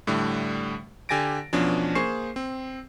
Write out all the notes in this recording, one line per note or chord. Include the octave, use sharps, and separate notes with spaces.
A2 D3 G3 A3
D3 G4 G#5 A6 A#6 D7
E2 B2 F3 C#4 D4
A#3 G#4 C5 C#6 C7 E7
C4